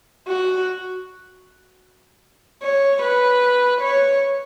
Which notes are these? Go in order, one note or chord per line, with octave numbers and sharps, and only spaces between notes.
F#4
C#5
B4
C#5